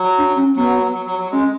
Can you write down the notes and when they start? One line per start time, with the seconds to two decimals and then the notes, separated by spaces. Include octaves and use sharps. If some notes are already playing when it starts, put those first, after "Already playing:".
Already playing: F#3
0.18 D4
0.36 C#4
0.56 F#3 B3
0.94 F#3
1.06 F#3
1.19 F#3
1.31 G#3 C#4